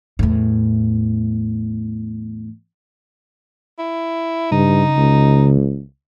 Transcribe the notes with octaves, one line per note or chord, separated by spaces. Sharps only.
E2 A2
E4
G2 C#3 D#4
C#2